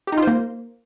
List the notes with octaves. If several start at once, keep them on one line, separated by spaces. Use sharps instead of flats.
G4
D#4
F4
C5
A#3